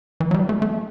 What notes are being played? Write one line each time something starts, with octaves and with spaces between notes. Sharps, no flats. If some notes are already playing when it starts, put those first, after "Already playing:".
E3
F#3
G3
A3
A3